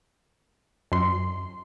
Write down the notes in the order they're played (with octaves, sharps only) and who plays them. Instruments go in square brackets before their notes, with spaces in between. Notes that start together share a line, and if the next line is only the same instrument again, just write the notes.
[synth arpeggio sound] F#2 C6